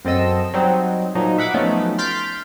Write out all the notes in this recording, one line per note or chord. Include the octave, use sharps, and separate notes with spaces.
F#2 C4 A4 D#5 E6
F#3 G3 C4 D#4
A#2 F3 F#3 D#4
E5 F#5 B5 D6
F3 F#3 A3 B3 C#4 D#4
C6 F6 G6 A6 B6 D7